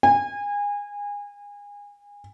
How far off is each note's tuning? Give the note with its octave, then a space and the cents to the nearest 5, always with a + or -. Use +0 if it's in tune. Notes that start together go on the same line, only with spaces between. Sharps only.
G#5 -25